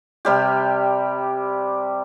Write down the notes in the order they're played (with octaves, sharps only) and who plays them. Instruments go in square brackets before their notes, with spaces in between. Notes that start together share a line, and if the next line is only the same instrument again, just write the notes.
[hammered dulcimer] C3 G3 G4